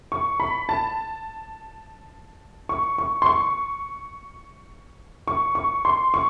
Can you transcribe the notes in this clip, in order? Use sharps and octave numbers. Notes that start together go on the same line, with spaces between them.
C#6
B5
A5
C#6
C#6
C6
C#6
C#6
C#6
C6
C#6